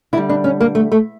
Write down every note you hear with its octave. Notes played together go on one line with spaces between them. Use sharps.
D3 G3 E4
D4
C#4
A#3
A3
A3